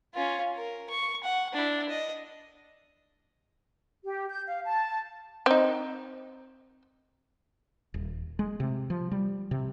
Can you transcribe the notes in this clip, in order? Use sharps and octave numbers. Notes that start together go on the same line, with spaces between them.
C#4 F4
A#4
C#6
F#5
D4 E4
D#5
G4
G6
F5
A5
C4 D#4
D#1
G#3
C3
F3
G3
C3